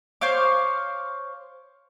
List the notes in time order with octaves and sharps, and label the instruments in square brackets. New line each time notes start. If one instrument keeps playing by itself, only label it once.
[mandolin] C5 C#5 F5 D6